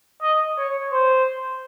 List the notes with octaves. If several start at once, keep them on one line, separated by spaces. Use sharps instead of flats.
D#5
C#5
C5